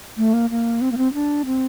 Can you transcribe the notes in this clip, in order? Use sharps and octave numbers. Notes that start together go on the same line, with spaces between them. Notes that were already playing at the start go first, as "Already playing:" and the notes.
A3
A#3
A#3
C4
A#3
C4
D4
C4